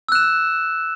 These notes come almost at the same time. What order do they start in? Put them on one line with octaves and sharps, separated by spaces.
E6 F#6 E7